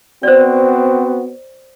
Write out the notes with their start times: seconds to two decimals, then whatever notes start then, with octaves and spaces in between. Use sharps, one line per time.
0.23 B3 C4 F#4 C5 D5